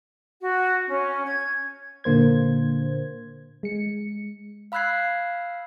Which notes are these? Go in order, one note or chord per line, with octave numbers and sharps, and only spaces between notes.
F#4
C#4
G#6
A#2 D3 A#3 C5 G#6
G#3 C#7
F5 B5 E6 F#6 G#6 C7